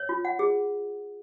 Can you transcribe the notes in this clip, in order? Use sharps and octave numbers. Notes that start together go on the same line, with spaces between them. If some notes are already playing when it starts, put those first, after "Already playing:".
Already playing: C#5
F4
F#5
G#4